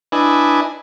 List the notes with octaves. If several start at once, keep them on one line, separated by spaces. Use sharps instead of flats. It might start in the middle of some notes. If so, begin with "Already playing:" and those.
D4 E4 B4 D#5 G#5